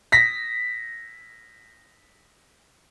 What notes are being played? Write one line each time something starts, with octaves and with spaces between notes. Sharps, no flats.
A#6 B6